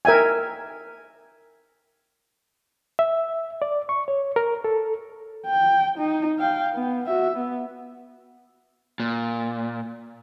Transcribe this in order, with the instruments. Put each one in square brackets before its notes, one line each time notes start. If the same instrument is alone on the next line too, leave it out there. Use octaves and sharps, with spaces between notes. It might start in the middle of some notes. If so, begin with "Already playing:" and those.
[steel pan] A#4 E5 G5 G#5
[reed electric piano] E5
D5
C#6
C#5
A#4
A4
[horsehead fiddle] G5
D#4
F5 G5
B3
F#4 E5
B3
[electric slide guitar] A#2